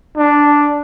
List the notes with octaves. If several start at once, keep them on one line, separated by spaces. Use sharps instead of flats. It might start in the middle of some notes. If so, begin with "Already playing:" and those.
D4